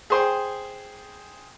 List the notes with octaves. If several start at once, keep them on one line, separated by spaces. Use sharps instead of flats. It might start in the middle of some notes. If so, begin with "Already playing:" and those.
G#4 C5 G5